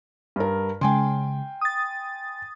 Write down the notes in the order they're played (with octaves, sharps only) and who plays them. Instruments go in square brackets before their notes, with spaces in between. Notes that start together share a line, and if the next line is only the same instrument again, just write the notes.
[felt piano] G2 A#4
[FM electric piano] C#3 G#3 [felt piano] G5 G#5 C6
[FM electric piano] D#6 A6